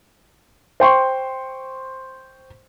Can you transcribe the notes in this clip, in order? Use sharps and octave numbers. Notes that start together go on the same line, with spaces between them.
C5 G5 C6 C#6